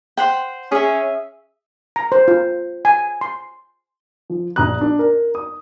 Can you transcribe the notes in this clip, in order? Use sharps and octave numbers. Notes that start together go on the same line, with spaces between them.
C5 F#5 G5
C#4 G#4 E5
A#5
C5
F4
G#5
C6
F3
A#1 A#5 D#6 F#6
D4
A#4
D#6